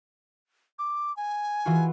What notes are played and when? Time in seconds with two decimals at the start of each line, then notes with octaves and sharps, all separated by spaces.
0.79 D6
1.17 G#5
1.66 E3 F4 F#4